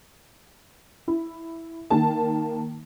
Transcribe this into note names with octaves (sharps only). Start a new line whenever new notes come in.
E4
D#3 A#3 A5